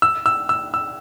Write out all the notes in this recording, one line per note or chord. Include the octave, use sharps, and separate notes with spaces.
E6
E6
E6
E6